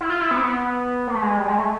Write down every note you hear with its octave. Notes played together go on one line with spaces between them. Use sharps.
E4
F4
E4
B3
C4
B3
A#3
A3
G#3
G3
G#3
A3